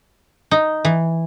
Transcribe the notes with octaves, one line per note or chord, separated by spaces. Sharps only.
D#4
E3